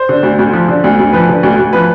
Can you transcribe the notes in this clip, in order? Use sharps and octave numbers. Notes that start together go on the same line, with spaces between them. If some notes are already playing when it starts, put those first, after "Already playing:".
Already playing: C5
D3
D2
D2
F3
D3
D2
D2
F3 B4
D3
D2
D2
F3 B4